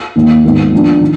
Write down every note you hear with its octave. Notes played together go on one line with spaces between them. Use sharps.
D#2 D#3 A#3
G#2 D#3 G#3 B3
F3 B3 D4
D#3